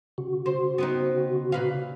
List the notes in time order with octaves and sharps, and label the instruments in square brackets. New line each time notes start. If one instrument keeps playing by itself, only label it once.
[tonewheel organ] C#3 F#4
[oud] C5
B3 C4 D#4
A#2 B4 F5